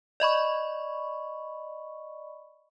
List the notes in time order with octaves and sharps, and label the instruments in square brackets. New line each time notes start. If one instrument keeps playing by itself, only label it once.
[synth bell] D5 D#5 B5 C#6